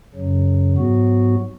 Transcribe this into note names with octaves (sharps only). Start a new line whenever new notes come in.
F#2 C#3 F#3
G#2 F#3 B3 F#4